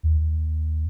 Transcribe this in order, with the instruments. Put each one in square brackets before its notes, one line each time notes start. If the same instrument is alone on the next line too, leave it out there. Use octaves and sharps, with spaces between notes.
[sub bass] D#2